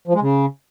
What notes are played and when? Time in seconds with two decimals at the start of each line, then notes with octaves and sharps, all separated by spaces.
0.07 F3
0.14 G#3
0.22 C#3